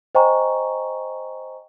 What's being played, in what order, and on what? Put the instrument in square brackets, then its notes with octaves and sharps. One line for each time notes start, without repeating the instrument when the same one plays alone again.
[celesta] C5 D#5 G5 G#5 A#5 C#6